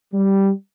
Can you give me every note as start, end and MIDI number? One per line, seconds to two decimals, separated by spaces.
0.14 0.50 55